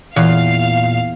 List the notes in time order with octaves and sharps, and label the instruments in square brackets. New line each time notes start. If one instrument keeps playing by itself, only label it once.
[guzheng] E2 [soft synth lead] A#2 [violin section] F5